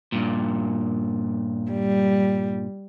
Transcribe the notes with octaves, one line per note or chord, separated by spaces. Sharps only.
G2 A#2
G3